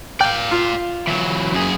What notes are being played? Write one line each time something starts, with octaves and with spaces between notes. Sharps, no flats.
D5 F5 G5
F4
E3 F#3
F#2 G#4